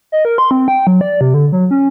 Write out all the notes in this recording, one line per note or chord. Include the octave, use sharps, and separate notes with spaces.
D#5
A#4
C6
C4
G5
F#3
D5
C3
D3
F#3
C#4